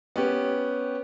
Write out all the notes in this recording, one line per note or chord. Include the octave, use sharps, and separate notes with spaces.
B3 C#4 G4